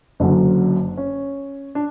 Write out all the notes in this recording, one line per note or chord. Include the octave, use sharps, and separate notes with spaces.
F#1 F#2 D3 F#3 D4
C#4
D4